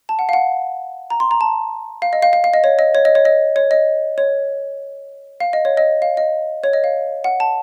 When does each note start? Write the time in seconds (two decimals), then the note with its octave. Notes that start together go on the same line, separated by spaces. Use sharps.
0.09 A5
0.19 F#5
0.29 F5
0.33 F#5
1.10 A#5
1.20 C6
1.31 A#5
1.41 A5
2.02 F5
2.13 D#5
2.22 F5
2.33 F5
2.44 F5
2.53 D#5
2.64 C#5
2.79 D#5
2.95 C#5
3.05 D#5
3.15 C#5
3.25 D#5
3.56 C#5
3.71 D#5
4.18 C#5
5.40 F5
5.53 D#5
5.65 C#5
5.77 D#5
6.02 F5
6.17 D#5
6.64 C#5
6.73 D#5
6.84 F5
7.24 F#5
7.40 A5